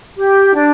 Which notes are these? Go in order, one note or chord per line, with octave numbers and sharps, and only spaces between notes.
G4
D4